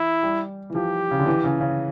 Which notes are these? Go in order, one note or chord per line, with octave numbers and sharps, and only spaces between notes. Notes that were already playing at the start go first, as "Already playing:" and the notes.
Already playing: E3 E4
G3
E3
F3 G4
C#3
D3
E3
C#3
C#3